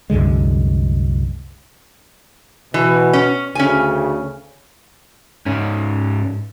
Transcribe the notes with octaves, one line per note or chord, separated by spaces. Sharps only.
C2 F#2 D3 G#3
B2 E3
C#4
D2 C#3 C#4 G#5
G#2 C#4